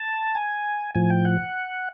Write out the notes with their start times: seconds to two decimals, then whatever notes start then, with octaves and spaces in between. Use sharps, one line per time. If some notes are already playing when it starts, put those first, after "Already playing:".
Already playing: A5
0.35 G#5
0.95 A2 F3 G#5
1.10 G5
1.25 F#5